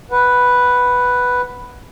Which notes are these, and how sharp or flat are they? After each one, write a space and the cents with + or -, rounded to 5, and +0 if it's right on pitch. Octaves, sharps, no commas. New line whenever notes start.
B4 +0 F#5 +0